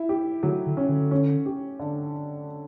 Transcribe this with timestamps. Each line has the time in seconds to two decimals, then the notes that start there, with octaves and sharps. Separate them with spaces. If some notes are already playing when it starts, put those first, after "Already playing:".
Already playing: E4
0.09 G4
0.43 D3 F#3
0.67 D3
0.77 C#4
0.89 D3
1.11 C#4
1.46 G4
1.80 D3